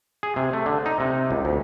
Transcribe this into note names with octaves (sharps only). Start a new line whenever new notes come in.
G#4
C3
A3
D3
D#4
C3
C#2
D2